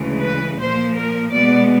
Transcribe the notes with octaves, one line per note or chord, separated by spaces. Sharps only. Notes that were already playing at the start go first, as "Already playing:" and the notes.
Already playing: D2 C#3 E3 G#3
B4
A#2 F3 A#3 C5
A#4
B2 G#3 B3 D5